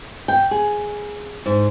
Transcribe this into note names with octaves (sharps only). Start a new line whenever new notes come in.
G5
G#4
G#2